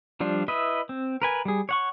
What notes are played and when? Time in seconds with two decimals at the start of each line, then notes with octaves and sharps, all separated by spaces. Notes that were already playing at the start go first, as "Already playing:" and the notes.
0.20 F3 G3 D4 F4
0.48 E4 B4 D#5 E5
0.89 C4
1.22 A#4 B4 G#5
1.45 G3 G#4
1.69 C#5 F#5 C#6